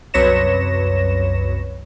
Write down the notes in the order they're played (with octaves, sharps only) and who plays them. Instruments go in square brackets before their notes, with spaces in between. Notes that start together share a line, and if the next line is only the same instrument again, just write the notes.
[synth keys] C2 F#2 B4 C#5 A#6 E7